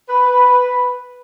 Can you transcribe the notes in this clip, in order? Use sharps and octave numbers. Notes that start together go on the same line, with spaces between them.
B4